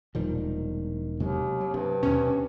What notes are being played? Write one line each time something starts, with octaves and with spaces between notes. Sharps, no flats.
E1 A#2 D#3 F3 G3
D#2 C3 F#3 G#3
F#3
G2 C3
D#2 B2 C#4